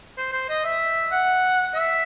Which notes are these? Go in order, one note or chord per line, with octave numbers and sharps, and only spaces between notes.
C5
C5
D#5
E5
F#5
E5